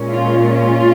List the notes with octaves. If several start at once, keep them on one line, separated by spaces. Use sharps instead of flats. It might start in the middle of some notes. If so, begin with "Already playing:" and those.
Already playing: A#2 G#3 C#4
F4
F4